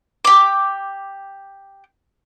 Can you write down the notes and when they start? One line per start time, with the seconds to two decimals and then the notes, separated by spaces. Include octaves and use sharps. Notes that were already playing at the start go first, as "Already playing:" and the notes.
0.25 G4 D6